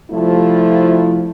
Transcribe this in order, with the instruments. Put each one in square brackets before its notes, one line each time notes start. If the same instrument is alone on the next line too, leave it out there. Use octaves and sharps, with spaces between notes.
[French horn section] C3 F3 G3 A3 E4 F4